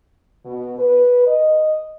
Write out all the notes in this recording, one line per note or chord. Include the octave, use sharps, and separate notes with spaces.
B2
B4
D#5